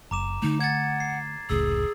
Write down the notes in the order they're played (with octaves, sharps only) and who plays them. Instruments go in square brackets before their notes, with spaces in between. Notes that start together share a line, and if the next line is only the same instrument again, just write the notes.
[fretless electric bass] F#1 [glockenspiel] A#5 D6 E7
[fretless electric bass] D3 A3 [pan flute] D#4
[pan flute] F#5 [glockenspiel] G#6 A6
[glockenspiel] C7
[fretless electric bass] F1 C#2 A2 [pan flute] G#4 [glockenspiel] E6